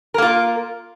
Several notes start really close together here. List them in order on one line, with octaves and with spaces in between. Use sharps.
A#4 A#3 F4